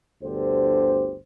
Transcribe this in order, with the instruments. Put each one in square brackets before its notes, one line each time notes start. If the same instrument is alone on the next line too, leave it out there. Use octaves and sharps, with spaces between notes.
[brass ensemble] G1 D2 D3 G4 C5